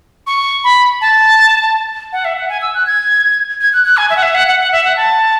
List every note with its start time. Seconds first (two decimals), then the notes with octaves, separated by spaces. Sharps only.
0.27 C#6
0.64 B5
1.01 A5
2.13 F#5
2.25 E5
2.37 F#5
2.49 G#5
2.62 E6
2.74 F#6
2.86 G#6
3.61 G#6
3.73 F#6
3.85 F#6
3.97 G#5
4.10 E5
4.16 F#5
4.23 E5
4.35 F#5
4.47 F#5
4.59 F#5
4.72 E5
4.84 F#5
4.97 A5